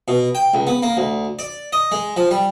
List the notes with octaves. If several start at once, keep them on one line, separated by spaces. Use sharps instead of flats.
B2
G5
C#2
B3
A#3
D2
D5
D#5
G#3
F3
G3